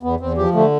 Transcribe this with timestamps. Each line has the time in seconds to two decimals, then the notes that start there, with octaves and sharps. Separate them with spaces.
0.03 E2 B3
0.20 E2 C4
0.37 F3 G4
0.54 D3 A3